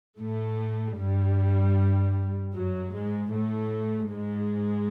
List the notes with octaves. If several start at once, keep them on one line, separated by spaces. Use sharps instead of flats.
A2 A3
G2 G3
F#2 F#3
G#2 G#3
A2 A3
G#2 G#3